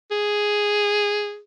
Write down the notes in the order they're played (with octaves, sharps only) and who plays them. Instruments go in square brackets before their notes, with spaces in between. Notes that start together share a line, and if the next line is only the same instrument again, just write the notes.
[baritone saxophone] G#4